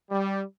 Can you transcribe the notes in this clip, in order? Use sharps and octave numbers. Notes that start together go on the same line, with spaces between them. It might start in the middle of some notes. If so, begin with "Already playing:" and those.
G3